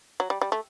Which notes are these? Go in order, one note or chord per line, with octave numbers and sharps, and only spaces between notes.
F#3
G3
G3
A3